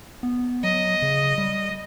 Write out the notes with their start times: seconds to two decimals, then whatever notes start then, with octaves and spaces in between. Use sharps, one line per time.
0.23 B3
0.64 F#3 D#5
1.02 C#3
1.38 G3